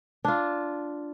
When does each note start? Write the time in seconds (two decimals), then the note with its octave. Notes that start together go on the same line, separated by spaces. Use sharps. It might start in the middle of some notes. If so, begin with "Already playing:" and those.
0.25 D4 F4